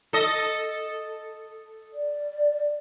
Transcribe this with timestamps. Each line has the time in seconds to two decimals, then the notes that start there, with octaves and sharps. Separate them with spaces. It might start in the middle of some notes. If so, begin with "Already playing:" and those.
0.13 A4 D#5
1.94 D5